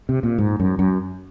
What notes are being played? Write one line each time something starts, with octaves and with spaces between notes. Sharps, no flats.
C3
A#2
G#2
F#2
F#2